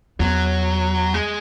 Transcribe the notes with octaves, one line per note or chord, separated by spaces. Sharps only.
E2 F#3
G#3